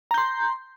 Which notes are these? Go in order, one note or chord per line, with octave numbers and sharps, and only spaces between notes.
A#5 C6 G6